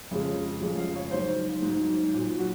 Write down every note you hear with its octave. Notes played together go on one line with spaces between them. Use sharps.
F2 C#3 G#3
F2 C#3 G#3
F5
C#5
G#2 F#3 C5
G#2 F#3
A#2 F#3
F#4